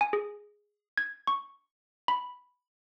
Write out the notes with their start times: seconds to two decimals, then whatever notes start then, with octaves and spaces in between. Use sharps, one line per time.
0.01 G#5
0.13 G#4
0.98 G#6
1.27 C#6
2.08 B5